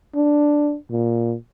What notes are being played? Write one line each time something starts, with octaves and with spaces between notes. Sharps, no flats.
D4
A#2